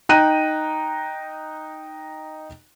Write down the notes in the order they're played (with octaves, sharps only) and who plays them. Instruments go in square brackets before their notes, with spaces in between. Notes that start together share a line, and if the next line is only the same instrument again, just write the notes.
[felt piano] D#4 G5 A#5 F#6 D#7